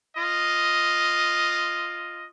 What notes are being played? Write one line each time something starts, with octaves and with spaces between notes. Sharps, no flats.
F4 D#5